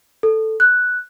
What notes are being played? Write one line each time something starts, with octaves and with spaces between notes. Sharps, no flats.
A4
F#6